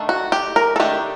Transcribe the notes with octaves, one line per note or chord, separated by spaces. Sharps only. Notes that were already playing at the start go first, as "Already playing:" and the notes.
Already playing: D#3 A3 D4
F#4
G4
A#4
A4
D#3 A3 D4 G4